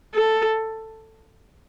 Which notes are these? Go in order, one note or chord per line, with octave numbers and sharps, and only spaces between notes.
A4